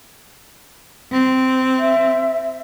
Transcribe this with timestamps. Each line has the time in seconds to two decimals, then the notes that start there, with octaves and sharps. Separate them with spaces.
1.13 C4
1.79 E5